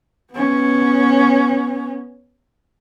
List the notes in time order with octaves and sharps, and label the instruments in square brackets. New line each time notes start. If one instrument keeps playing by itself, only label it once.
[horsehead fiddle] B3 C#4